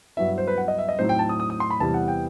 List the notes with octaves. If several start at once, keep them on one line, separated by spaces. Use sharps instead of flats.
G2 F#3 B3 E4 E5
C5
B4
F#5
D#5
E5
D#5
A2 F#3 C4 D#4 C5
G5
A5
D#6
D#6
D#6
C6
B5
E2 C3 E3 G3 B3 A5
F#5
G5